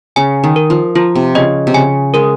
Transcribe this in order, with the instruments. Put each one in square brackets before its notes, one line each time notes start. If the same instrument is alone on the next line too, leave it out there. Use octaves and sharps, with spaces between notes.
[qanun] C#3 [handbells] G#5
[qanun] D#3
[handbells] A#4
[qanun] F3
[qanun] F3 [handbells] F4
[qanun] C3
[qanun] C#3 [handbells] D#5
[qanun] C3
[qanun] C#3 [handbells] G#5
[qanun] G#3 [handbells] A#4